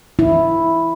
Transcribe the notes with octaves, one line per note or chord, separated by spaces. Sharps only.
E4